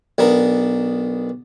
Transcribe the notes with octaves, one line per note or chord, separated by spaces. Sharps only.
B1 B3 D4 A#4